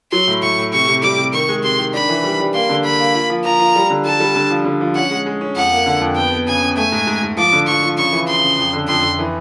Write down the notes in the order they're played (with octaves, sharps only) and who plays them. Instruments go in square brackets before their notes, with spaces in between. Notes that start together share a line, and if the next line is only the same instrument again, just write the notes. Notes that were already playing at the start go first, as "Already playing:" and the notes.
[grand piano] F#3 [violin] C6
[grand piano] A2
[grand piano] A2 [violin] C#6
[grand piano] A2
[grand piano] C3 [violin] C#6
[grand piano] C3
[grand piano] G3 [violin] D6
[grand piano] C3
[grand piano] D#3 [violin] C#6
[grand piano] G#3
[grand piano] C3 [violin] C6
[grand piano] D#3
[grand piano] D4 [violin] B5
[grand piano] E3
G3
G3
[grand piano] A#3 [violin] C6
[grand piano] D3
[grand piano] A#3 [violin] B5
[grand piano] A#3
F4
F3
[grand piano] F3 [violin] A#5
[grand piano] F4
G3
D3
[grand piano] G3 [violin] A5
[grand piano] G3
D3
F3
D3
F3
[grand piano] C#4 [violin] F#5
[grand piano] G#3
G#3
C#4
[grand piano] F2 [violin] F#5
[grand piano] A#3
D3
F2
[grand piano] B3 [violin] G5
[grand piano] B3
[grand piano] C#3 [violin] G#5
[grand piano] C#3
[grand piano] A3 [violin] G#5
[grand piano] G#2
G#2
G#2
[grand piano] F3 [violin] D6
[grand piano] D3
[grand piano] F3 [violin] C#6
[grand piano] F3
[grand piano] C#3 [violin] C#6
[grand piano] E3
[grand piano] C#3 [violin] C6
[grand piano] C#3
F2
D3
[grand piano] F2 [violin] C6
[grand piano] F2
E3